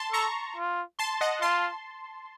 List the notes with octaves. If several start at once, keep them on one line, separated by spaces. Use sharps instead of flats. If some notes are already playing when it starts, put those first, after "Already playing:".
Already playing: A5 C6
A4 A#5 C#6
F4
A5 C6
D#5 F#5
F4 A5 C6